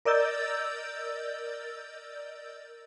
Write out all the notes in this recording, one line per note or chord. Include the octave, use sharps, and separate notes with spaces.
A#4 D5 D#5 E6 G6 A6